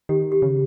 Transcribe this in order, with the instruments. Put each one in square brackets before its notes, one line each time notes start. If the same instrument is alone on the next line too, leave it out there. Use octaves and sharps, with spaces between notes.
[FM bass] D#3 [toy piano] G4
[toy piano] G4
[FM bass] C#3